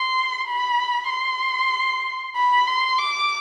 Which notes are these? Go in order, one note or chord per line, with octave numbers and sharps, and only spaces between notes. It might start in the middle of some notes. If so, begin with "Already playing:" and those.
Already playing: C6
B5
C6
B5
C6
D6